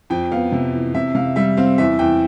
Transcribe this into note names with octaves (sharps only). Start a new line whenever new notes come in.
F2 G5
B3 F5
C3
E3
C3 E5
C3 F5
G3 E5
C4 F5
E2 E5
E2 G5